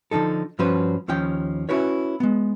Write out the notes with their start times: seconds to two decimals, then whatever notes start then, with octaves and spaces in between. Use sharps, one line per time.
0.11 D3 E3 F3 D#4 A4
0.59 G2 F3 C#4 F#4 B4 C5
1.08 D#2 F3 C#4 G5
1.69 C#4 E4 F#4 B4 C#5
2.20 G#3 B3